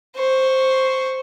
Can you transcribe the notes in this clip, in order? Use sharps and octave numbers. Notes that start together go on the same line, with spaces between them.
C5 C#6